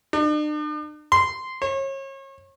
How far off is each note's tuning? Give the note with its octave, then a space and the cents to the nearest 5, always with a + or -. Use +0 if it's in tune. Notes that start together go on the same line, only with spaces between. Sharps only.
D4 +45
C6 -10
C#5 -35